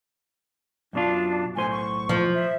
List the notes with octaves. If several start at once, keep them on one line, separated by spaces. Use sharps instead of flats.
F#2 B2 D4 F4
B1 A2 C5 G#5
C#6
F3
E5